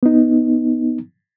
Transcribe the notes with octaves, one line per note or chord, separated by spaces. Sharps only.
B3 D#4